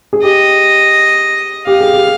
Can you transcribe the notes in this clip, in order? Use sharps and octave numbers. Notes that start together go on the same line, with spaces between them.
G#4
G4 D#5
G4 F5
G#4
G4